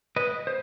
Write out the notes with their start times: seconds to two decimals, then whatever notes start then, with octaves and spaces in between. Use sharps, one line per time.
0.16 B4 D#5
0.47 C5